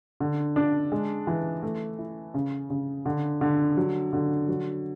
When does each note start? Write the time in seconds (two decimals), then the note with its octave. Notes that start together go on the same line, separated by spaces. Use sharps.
0.20 D3
0.56 D4
0.92 G#3
1.27 E3
1.63 A3
1.99 E4
2.34 C#3
2.70 C#3
3.06 D3
3.41 D3
3.77 F#3
4.13 D3
4.48 F#3